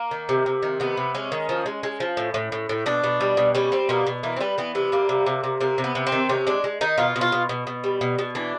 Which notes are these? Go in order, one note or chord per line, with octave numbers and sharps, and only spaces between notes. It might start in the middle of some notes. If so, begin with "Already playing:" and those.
Already playing: A#3
D#3
C3
C3
D#3
C3 B3
C3
G#3 C#4
D#3
F3
G#3
G#3
F3
A2
A2
A2
A2
B2 D4
B2
G3
B2
G3 C#4
G3 C4
B2 A#3
B2
E3 A#3
C4
G3 B3
E3 B3
C3 B3
G3 A#3
C3
C3
C3
C3 A#3
C3
B3
C3
C4
D#3
C3 C#4
G#3 D4
G#3
D#3 D#4
B2 F4
B2
F4
B2
B2
B2
G3
B2
B2
E3 D4